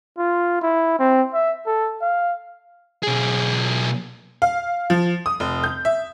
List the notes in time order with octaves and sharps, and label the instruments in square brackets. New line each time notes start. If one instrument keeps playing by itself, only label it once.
[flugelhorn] F4
E4
C4
E5
A4
F5
[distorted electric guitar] B1 G#4
[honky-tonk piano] F5
F3
D#6
F1
G6
E5